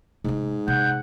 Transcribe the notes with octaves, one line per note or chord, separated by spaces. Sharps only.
G#2 C3 D4
C3 F#5 G6